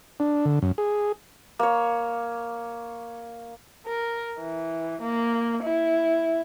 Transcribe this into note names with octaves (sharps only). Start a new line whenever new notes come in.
D4
D3
F#2
G#4
A#3 C#5
A#4
E3
A#3
E4